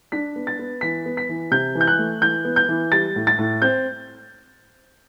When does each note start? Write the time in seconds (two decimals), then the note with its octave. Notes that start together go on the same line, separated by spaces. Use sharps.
0.12 D4 B6
0.36 B3
0.47 A6
0.59 B3
0.81 E3 B6
1.06 B3
1.17 B6
1.29 E3
1.51 C3 G6
1.75 E3
1.81 G6
1.87 F#6
1.98 A3
2.21 E3 G6
2.45 B3
2.56 G6
2.69 E3
2.92 G3 A6
3.16 A2
3.27 A6
3.39 A2
3.62 C4 G6